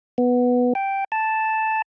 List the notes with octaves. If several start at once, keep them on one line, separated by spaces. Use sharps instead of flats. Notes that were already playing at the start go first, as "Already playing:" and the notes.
B3
G5
A5